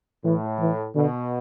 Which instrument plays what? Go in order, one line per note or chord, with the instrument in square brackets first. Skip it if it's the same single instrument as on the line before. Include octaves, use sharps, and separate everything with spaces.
[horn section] A2 [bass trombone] E3
[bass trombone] E3
[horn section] B2 [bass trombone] D3